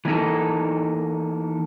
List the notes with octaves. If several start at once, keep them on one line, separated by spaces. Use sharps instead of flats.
E3 A#3 D#4 A4